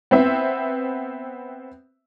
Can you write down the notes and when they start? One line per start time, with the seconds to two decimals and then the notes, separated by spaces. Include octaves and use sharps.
0.11 B3 C4 E5